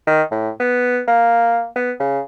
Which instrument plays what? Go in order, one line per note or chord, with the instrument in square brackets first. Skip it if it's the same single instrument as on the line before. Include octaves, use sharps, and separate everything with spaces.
[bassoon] D#3
A2
B3
A#3
B3
C#3